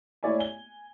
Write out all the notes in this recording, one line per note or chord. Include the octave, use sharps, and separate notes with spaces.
A3 E4 C#5 D5 E5 G#5
G#5 G7